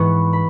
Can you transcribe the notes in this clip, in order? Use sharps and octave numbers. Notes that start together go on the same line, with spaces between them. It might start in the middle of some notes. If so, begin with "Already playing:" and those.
Already playing: G#2 E3 B3 B5 C#6
B5